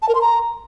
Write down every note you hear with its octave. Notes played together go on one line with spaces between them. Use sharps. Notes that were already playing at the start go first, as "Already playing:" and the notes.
A5
A#4
C6
A#5